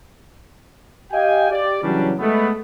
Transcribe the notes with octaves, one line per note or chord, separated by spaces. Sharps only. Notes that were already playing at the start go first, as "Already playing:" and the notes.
G4 D#5 F5 G5 G#5
G4 D5
C#3 E3 F#3 G3 C#4 D4
G#3 A3 B3